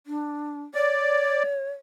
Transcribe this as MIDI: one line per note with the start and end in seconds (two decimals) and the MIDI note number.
0.07 0.62 62
0.75 1.69 73
0.75 1.43 74